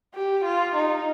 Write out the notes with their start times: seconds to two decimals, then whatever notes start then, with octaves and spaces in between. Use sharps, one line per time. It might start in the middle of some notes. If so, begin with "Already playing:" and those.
0.14 G4
0.44 F4
0.75 D#4